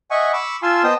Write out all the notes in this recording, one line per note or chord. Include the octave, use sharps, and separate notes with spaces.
D#5 E5 F#5 G#5 C#6
B5 C#6 D6 E6
F4 F5 G#5 A5 C6 E6
B3 C5 D#5 G5 A5 D#6